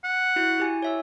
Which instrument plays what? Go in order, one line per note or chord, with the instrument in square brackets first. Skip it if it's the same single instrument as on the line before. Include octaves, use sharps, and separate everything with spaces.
[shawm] F#5
[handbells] E4 F#4 G6
E4 G4 G#5
C#5 E5 E6